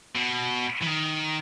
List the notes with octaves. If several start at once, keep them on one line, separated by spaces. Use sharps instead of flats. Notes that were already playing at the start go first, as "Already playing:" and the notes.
B2
E3
D#3